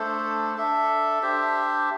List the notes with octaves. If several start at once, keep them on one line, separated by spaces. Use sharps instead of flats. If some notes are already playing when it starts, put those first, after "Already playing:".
Already playing: A3 D4 A4 C5
D4 A4 E5
D4 G4 C5 E5